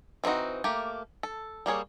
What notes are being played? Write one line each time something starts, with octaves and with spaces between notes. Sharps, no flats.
E3 C4 D4 D#4 F#4
A3 A#3 G4
A4
G3 A#3 G#4 C#5